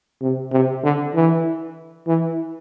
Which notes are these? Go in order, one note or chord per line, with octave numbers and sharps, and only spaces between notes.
C3
C3
D3
E3
E3